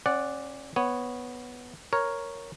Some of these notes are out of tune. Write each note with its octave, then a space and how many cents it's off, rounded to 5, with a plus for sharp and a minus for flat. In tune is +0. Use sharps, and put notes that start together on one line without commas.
C#4 -35 D5 +0 F#5 +0
B3 +0 C#5 -5
A#4 +5 C#5 +0